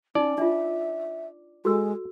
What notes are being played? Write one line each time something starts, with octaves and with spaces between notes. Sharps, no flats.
C#4 D#4 D5
D4 F4 E5
G#3 F#4 A4 E6